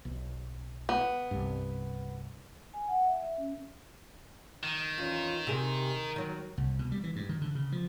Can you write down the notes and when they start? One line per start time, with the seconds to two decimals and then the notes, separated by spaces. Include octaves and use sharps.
0.05 B1
0.89 B3
1.31 C2 G2
2.74 G#5
2.88 F#5
3.05 E5
3.23 E5
3.38 C#4
4.63 D#3
4.98 E2 C#4 F4
5.47 C3 G#4 A#4
6.16 D#3 F#3
6.57 C2
6.79 B2
6.92 G3
7.04 E3
7.16 G2
7.29 D#3
7.41 D3
7.55 C#3
7.72 F3